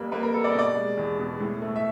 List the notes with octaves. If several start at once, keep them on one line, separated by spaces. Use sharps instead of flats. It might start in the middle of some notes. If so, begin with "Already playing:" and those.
Already playing: F2 G3 A#3 B4
A#3 B4
A#4
G3 A4
D5
D#5
B2 D5
G#3
E2
B2
A2
A3
E5